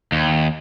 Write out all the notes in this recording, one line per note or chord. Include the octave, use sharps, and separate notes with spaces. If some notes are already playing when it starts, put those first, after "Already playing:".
D#2